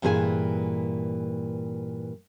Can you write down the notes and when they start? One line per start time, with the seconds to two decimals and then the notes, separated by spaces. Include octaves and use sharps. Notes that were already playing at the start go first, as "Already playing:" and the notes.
0.02 G2 A#2 E3 G#4 B4 G#5